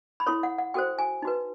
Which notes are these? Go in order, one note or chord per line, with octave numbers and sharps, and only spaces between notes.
B5
E4 A4 C#5 C6
F#5
F#5
F#4 A4 C5 G5
G#5
D#4 F#4 B4